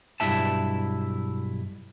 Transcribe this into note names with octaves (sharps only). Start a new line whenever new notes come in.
B1 G2 E4 E5 A5